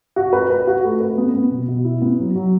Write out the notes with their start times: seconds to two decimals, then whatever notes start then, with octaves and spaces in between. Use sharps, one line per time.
0.16 F#4
0.33 B4
0.50 B4
0.67 F#4
0.84 A3
1.01 B4
1.18 B3
1.34 B3
1.51 B2
1.68 B2
1.85 E4
2.02 B3
2.19 F#3
2.36 F#3